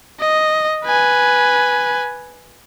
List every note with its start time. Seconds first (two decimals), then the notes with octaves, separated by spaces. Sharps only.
0.20 D#5
0.85 B4 G#5